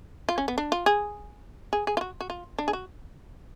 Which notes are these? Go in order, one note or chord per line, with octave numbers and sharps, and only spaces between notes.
F4
C#4
B3
D4
F4
G#4
G#4
G#4
F4
F#4
F#4
F4
D4
G#4
F#4